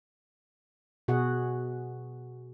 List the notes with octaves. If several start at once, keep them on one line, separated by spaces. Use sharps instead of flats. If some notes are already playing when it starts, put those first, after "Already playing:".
B2 F#4 G#4 F#5